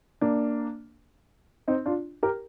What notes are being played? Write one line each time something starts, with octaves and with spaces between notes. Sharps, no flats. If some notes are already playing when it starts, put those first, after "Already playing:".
A#3 D4
C4 D#4
D4 F4
G4 A#4